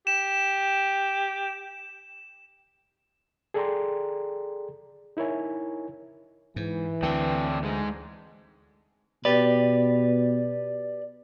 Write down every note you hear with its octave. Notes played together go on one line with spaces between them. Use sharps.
G4 E7
G#4 A4 D5 G5 A#5 C6
D#4 E4 A#4 C#5 G#5
G#2 E3
D2 D3 C4 D4 G5
G#2 G#3
B2 G4 B4 D5